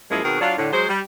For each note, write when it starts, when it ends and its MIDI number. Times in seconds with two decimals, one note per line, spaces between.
0.11 0.22 42
0.11 0.22 53
0.11 0.22 56
0.11 0.22 58
0.11 0.22 64
0.11 0.22 68
0.24 0.39 47
0.24 0.39 51
0.24 0.39 60
0.24 0.39 66
0.24 0.39 68
0.24 0.39 70
0.41 0.54 54
0.41 0.54 62
0.41 0.54 65
0.58 0.70 45
0.58 0.70 50
0.73 0.89 54
0.73 0.89 56
0.73 0.89 68
0.73 0.89 72
0.89 1.00 55